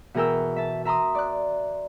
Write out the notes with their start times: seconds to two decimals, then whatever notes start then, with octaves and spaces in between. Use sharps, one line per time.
0.14 B2 E3 G#4 A#4 G5 E6
0.56 E5 A5
0.85 E5 A#5 C6 D#6
1.15 D5 F#6